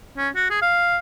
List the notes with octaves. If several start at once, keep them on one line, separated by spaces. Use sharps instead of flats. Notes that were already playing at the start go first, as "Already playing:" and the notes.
C#4
F#4
G#4
F5